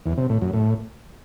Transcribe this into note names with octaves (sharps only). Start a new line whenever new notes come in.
E2
C3
A2
F#2
A2